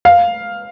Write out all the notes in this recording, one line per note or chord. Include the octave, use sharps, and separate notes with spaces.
F5